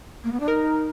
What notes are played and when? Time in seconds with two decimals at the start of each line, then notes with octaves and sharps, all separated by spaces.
0.24 A#3
0.32 B3
0.40 D4
0.48 D#4 A#4